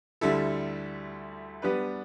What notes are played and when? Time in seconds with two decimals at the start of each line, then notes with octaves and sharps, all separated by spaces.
0.21 D2 D3 G3 E4 A4
1.62 G3 B3 D4 G4 B4